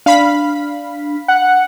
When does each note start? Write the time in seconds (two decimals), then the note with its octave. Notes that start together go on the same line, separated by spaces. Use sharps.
0.06 D4 F5 B5 B6
1.28 F#5